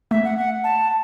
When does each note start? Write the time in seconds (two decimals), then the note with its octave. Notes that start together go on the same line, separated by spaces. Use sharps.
0.11 A3 E5
0.24 F#5
0.38 F#5
0.64 A5